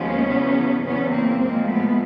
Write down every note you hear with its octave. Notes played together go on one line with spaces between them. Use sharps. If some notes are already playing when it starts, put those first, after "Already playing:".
Already playing: D#2 F3 G#3 B3 C#4
E2 C#3 F#3
E2 C#3 F#3 B3 C#4
A#3 C4
A#2 F3 G#3
A3 B3